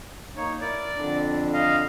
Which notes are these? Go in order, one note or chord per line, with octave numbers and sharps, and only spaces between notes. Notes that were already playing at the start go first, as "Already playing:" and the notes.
A#3 D#4 C#5
E4 A#4 D5
F2 D3 D4
D#5 F5